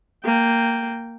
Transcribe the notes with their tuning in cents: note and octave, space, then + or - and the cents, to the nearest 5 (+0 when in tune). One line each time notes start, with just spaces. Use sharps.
A#3 -10 G5 +0